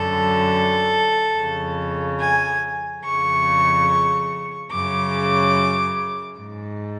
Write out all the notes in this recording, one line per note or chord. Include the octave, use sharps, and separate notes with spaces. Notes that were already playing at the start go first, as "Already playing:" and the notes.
Already playing: F#2 D3 A4
F2 C#3
G#5
F2 C#3 C#6
F#2 C#3 D6
G#2